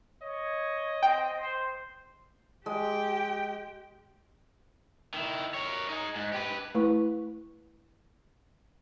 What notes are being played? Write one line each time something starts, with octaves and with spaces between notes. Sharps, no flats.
C#5 D#5
C4 G5
C5
G#3 G4 G5
D#3 E4
A#4 C#5
D#4 G#4
G#2
G4 B4
A3 E4 B4 C#6